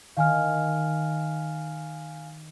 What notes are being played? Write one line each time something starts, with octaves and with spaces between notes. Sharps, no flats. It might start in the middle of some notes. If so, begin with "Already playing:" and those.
D#3 F5 G#5 F6